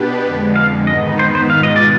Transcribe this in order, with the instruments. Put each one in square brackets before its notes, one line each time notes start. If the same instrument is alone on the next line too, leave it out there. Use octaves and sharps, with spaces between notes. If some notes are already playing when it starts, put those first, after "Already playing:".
Already playing: [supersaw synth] B2 B3 D4 G4 B4
F2 D3 G#3
[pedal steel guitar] F5
[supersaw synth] G#2 D#3 B3 D#4 B4 [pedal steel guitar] D#5
[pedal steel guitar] C5
C5
[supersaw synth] B2 G#3 B3 F4 [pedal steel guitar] F5
[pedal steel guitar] D#5
D5